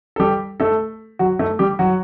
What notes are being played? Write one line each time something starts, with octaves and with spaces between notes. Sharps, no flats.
A4
G3 G4
A3 A4
F#3 F#4
A3 A4
G3 G4
F#3 F#4